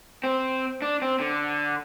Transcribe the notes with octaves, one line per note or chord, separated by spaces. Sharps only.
C4
D4
C4
D3